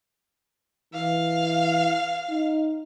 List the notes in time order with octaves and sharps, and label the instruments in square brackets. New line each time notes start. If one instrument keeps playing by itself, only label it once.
[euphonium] E3 [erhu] F5
[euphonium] D#4